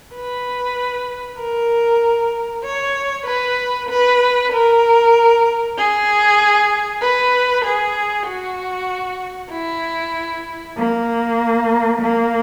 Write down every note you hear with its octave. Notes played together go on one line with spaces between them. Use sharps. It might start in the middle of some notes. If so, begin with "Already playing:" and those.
B4
A#4
C#5
B4
B4
A#4
G#4
B4
G#4
F#4
E4
A#3
A#3